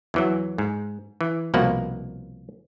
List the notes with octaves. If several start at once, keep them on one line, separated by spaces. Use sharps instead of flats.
E2 E3 F#3
G#2
E3
C2 B2 F3 A#3 F#5